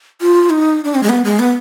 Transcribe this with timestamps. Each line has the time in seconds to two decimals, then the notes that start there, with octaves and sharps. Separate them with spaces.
0.21 F4
0.50 D#4
0.85 D4
0.95 C4
1.03 G#3
1.09 B3
1.25 G#3
1.39 B3